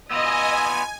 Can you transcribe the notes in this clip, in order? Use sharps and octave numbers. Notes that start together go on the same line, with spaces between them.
B3 F4 D#5 G#5 E6